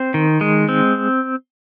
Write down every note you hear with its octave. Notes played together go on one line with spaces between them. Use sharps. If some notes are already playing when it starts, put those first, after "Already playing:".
Already playing: C4 C5
D#3
G#3
C4